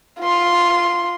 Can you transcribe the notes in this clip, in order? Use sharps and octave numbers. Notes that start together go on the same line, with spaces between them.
F4 C6